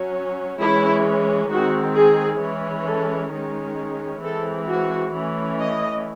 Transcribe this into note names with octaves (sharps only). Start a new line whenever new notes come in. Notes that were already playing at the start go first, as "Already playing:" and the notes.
Already playing: F#3 C#4
E3 G#3 C#4 E4
D#3 G#3 C4 F#4
G#4
E3 G#3 C#4
A4
D#3 G#3 C#4
E3 G#3 C4 A4
F#4
E3 A3 C#4
D#5